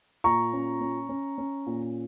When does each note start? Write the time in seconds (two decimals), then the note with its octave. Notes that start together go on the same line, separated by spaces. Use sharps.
0.24 A#2 A#5 C#6
0.53 C#4
0.81 C#4
1.09 C#4
1.38 C#4
1.66 A#2